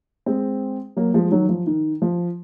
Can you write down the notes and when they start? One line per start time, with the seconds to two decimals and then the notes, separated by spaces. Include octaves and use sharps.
0.26 G#3 C4
0.97 F#3 A#3
1.14 F3 G#3
1.31 D#3 F#3
1.49 F3
1.67 D#3
2.02 F3